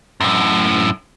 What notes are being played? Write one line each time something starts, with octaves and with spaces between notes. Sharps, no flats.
F#2 A2